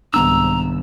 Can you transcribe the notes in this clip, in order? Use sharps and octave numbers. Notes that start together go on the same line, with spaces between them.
C2 G#2 D#3 B3 D4 A#5 E6